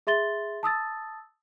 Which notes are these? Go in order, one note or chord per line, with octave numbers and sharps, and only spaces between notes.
G#4 E5 C6 A6 G7
A5 D#6 E6 A6